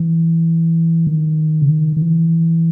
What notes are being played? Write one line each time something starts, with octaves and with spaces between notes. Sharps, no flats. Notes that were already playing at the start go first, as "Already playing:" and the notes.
Already playing: E3
D#3
C#3
D#3
D#3
E3